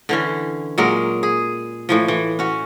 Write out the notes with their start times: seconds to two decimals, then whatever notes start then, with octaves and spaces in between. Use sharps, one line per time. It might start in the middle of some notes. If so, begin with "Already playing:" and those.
0.09 D3 E3 C#4
0.78 A#2 F#3 G#3 A#4
1.23 G#4
1.89 A2 E3 F3
2.08 E3
2.39 C#4 F#4